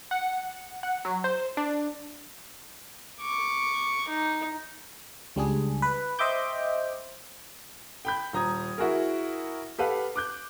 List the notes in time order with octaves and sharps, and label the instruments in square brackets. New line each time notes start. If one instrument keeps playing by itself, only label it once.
[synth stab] F#5
F#5
F#3
C5
D4
[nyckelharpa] C#6 D6
D#4
[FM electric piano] C#2 G3 D4 G#4
B4
C5 D#5 E5 G5 D6 G6
[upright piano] G5 B5 G6
D#1 A#5 D#6 G#6
E4 F#4 G#4 A#4
G4 A4 B4 F5 F#5
D6 F#6 G6